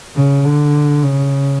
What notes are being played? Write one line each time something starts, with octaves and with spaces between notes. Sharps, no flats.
C#3
D3
C#3